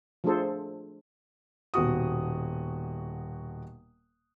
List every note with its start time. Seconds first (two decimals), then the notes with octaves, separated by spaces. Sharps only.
0.24 F3 A3 D4 G#4 A4 C5
1.74 D#1 B2 F#4 D#6